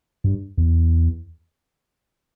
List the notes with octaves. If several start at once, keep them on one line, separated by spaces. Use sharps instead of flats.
G2
E2